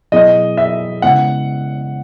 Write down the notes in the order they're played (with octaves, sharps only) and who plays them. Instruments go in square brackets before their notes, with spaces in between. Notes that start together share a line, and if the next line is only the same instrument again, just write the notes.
[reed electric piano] B2 F#3 B3 E4 G#4 [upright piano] D#5
[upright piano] E5
[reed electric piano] C#3 G#3 B3 E4 [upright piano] F#5